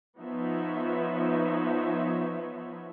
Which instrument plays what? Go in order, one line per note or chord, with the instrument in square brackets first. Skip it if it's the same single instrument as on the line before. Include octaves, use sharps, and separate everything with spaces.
[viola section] F3 B3 D#4 B4 C#5 E5